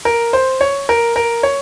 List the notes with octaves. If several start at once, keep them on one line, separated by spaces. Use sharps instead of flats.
A#4
C5
C#5
A#4
A#4
C#5